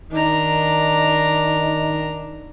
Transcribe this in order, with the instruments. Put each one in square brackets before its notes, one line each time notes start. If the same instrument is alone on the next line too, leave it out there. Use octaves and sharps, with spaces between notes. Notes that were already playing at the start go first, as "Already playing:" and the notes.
[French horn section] D#3 D#4 [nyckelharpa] D4 A#5